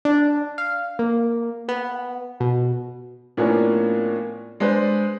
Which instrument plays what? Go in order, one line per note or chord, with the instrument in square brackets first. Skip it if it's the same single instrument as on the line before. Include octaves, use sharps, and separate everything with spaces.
[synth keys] D4
F5
A#3
B3
B2
[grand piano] A2 F3 A#3 B3 C#4 D4
G#3 D4 G#4 B4 C5